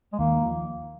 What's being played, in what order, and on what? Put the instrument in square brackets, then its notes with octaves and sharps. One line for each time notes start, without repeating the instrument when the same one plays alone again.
[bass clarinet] G#3
[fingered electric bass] D#2 D#3 [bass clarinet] A#3
[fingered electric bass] F3